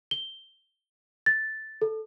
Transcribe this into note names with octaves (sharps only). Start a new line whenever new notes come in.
G7
A6
A4